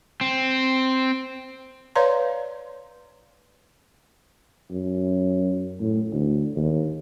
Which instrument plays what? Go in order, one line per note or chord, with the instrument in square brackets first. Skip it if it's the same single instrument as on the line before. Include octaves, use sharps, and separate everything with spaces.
[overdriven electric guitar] C4
[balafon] B4 C#5 D5 F5 A#5 C6
[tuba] F#2
A2
D2
D#2